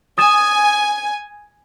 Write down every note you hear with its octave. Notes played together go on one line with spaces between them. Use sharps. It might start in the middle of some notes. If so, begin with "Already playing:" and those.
G#5 D#6 A6 E7